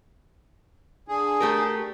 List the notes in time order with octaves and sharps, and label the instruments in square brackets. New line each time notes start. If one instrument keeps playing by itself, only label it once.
[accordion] D3 G#4
[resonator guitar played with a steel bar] A3 G4 A#4